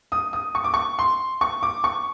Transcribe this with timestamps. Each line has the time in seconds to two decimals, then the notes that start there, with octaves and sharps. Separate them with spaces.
0.12 D#6
0.33 D#6
0.55 C#6
0.64 D6
0.74 C#6
0.99 C6
1.41 C#6
1.63 D6
1.84 C#6